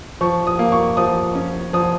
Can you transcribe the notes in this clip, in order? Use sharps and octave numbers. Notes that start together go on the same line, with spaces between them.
F3 C#6
D#6
A#3
C#6
F3 D#6
C#4
F3 D#6